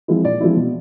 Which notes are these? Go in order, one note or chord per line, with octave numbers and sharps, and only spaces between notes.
F3 G#3 C4 E4
A#2 D5
F3 G#3 C4 E4
B2